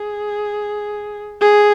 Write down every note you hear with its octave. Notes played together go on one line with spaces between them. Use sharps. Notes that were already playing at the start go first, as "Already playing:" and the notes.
Already playing: G#4
G#4